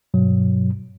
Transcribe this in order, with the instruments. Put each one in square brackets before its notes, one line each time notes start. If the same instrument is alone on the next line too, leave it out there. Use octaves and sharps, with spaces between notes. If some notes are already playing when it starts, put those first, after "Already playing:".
[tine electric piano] G2 B2 F#3